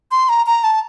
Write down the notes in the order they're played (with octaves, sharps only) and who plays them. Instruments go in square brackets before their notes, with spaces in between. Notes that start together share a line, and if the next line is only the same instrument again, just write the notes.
[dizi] C6
A#5
A#5
A5